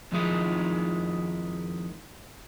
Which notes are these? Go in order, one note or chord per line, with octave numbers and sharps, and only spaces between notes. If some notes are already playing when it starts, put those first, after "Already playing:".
F2 D#3 F3 G#3 D#4 E4